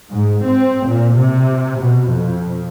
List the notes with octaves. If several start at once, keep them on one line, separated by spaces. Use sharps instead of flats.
G#2
C4
A#2
C3
B2
F2